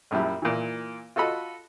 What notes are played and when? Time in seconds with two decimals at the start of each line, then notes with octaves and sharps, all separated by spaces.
0.11 A#1 F#2 G3 E4
0.42 A#2 E3
1.16 F4 F#4 A4 D#5 B5